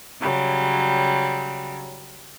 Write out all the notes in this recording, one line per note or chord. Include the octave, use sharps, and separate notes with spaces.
C#3 F#3 G3